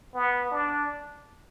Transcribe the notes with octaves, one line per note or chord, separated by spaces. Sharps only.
B3
D4